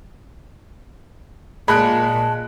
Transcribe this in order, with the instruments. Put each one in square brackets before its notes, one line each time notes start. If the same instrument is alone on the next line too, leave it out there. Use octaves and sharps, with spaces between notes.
[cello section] A#2 [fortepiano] G#3 [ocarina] A5 [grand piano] B5 F#6 D7